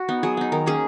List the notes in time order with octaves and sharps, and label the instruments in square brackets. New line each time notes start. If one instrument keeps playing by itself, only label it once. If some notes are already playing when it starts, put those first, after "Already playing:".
Already playing: [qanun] F#4
B3 D#4
F#3 G#4
B3 D#4
D#3 A#4
A#3 C#4 G#4